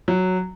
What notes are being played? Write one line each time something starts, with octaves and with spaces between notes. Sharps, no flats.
F#3